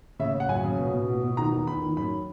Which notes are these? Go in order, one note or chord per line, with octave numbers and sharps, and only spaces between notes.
C#3 E5
C#3
F#5
F#2 G#5
C#3
B2
B2
B2
B2
D#3 A#5
E2
D#3 B5
D#3
F#2 B5